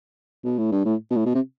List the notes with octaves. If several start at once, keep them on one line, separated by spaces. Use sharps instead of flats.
B2
A2
G2
A2
B2
A2
B2
C3